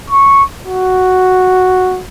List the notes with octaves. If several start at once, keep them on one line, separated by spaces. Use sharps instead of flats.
C#6
F#4